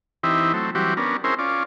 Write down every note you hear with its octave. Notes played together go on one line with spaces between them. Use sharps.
E3 C4 D#4 E4 G4
F#3 A3 C4
E3 F#3 G3 C4 F#4 G4
B3 C#4 D4 A#4
C4 C#4 E4 G#4 A#4 C5
C#4 F4 D5